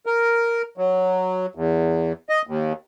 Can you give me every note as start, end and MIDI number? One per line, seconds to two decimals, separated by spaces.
0.06 0.62 70
0.78 1.46 54
1.55 2.13 40
2.29 2.42 75
2.47 2.73 39